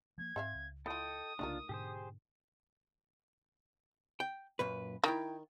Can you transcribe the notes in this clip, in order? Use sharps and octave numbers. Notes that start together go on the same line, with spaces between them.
F3 A3 A#3 G#6
G#2 C4 E5 F5
C#2
E4 F4 A4 D#5 G5 D#6
C2 C#3 A3 A#3 D4 D#4 F4 A#4
G#2 B2 D3 G4 G#4 C5
G5
F#2 A#2 B4
D#3 E4 G5 A#5